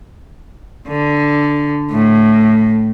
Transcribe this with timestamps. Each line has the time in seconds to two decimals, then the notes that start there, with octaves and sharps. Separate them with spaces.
0.89 D3
1.91 A2